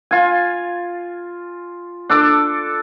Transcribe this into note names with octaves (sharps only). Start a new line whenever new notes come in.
F4 G#5
D4 A4 D6